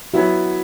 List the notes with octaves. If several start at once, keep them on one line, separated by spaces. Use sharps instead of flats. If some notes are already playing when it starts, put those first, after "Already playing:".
F#3 B3 E4 F#4